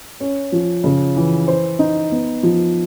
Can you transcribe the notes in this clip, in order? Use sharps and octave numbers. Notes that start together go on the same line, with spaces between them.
C#4
F3
C#3
E3
C5
D#4
B3
F3